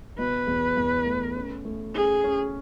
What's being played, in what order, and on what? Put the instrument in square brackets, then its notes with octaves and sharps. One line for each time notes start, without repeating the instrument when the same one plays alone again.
[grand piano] B2 [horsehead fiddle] B4
[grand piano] E2
E2
A3
C#4
A3
[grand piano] C#4 [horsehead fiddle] G#4
[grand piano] C#4